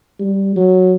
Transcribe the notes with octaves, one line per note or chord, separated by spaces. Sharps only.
G3
F#3